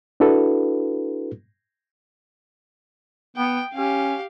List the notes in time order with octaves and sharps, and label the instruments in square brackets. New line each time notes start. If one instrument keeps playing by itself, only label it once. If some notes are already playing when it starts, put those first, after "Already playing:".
[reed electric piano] D4 E4 F#4 A4 B4
[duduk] B3 [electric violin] G5
[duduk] C#4 [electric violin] G4 F5